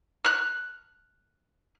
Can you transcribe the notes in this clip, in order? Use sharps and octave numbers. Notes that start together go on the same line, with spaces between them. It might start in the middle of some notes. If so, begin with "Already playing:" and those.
F6 F#6